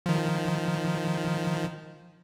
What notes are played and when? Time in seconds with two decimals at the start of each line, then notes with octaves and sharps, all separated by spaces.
0.06 D#3 F3